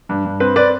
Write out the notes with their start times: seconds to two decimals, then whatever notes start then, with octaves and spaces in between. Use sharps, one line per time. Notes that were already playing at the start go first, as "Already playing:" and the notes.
0.09 G2
0.25 G2
0.40 C4 B4
0.56 C4 B4 D5